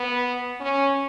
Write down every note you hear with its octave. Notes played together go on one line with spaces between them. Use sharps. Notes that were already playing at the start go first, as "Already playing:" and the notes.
Already playing: B3
C#4